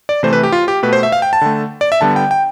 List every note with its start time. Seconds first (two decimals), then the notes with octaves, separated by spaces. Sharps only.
0.09 D5
0.23 C3 E3 A3 C5
0.33 B4
0.43 G4
0.52 F4
0.68 G4
0.83 B2 A3 B4
0.93 C5
1.03 E5
1.12 F5
1.22 G5
1.33 A5
1.41 D3 A3
1.81 D5
1.92 E5
2.01 D3 G3 B3 A5
2.16 G5
2.31 G5